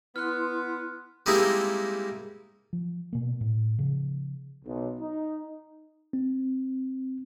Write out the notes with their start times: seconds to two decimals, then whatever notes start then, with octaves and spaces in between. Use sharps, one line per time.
0.16 B3 E4 C6 F6 F#6
1.26 G3 G#3 A#3 C4 D#4 E4
2.73 F3
3.13 B2 A#3
3.41 A2
3.79 C#3 F3
4.65 B1
5.00 D#4
6.13 C4